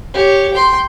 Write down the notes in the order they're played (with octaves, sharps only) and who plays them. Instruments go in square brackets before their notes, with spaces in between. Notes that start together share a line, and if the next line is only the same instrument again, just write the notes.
[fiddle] G4 C#5
G5 C6